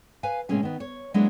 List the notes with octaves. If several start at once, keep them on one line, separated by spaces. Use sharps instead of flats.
B4 F5 G#5
A2 C3 G#3 A#3 C#4 G#4
D#3 B3
C#5
F#3 G#3 A#3 B3 D4 E4